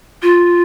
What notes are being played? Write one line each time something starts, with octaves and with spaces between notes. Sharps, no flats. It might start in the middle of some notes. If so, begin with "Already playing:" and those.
F4